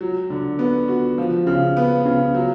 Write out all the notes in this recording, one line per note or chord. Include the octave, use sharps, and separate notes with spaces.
F#3
D3
B3
F#4
F3
C#3
B3
C#3
F#3